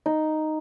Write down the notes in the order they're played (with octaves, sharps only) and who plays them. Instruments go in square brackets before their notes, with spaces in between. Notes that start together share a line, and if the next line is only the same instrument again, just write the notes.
[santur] D#4